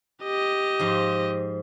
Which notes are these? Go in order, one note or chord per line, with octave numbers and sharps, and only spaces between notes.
G4 D#5
G#2 F3